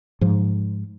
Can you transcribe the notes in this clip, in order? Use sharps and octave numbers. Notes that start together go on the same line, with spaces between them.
G#2 F3